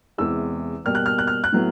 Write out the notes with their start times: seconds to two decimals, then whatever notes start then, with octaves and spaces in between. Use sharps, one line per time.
0.18 E2 C3 E3 G#3 E6
0.84 B2 G3 A#3 F6
0.95 F#6
1.06 F6
1.18 F#6
1.27 F6
1.44 F#6
1.52 A2 F#3 B3